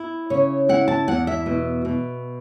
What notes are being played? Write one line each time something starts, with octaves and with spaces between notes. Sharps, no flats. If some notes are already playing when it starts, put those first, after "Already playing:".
Already playing: E4
C#3 C#5
E4 F#5
A5
E2 F#5
E5
B2
B2